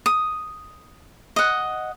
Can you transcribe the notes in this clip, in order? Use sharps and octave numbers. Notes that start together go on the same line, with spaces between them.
D#6
D#5 F#5